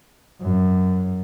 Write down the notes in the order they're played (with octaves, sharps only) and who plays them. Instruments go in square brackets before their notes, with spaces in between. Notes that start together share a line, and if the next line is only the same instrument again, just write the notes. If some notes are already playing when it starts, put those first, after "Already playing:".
[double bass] F#2